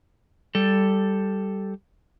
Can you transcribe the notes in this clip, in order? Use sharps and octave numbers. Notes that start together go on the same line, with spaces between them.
G3 A4